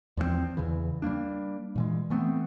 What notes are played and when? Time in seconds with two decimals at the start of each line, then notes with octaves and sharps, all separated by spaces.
0.17 E2 F3 F#3 C4
0.57 E2 C#3 E3
1.02 G3 A3 A#3 D4
1.76 A#2 E3 G#3
2.10 E3 A3 B3 C4